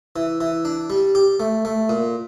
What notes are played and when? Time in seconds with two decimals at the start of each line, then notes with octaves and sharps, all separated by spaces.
0.16 E3
0.40 E3
0.65 D4
0.90 G3
1.15 G4
1.40 A3
1.65 A3
1.89 A#2